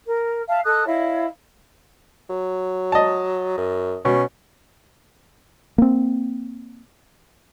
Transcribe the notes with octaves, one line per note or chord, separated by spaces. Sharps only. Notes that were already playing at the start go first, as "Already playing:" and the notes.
A#4
E5 F5 A5
A4 D#5 D#6 F#6
E4 C#5 D#5 F5
F#3
D#5 A5
F#2
B2 C#4
A#3 C4